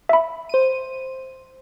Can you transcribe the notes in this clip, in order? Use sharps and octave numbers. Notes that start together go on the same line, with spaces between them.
E5 B5
C5 D#7